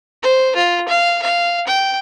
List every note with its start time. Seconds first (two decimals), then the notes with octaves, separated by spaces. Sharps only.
0.22 C5
0.56 F4
0.88 F5
1.22 F5
1.67 G5